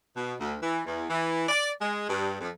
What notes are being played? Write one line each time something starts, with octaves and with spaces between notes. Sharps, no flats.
B2
D2
E3
E2
E3
D5
G#3
G2
F2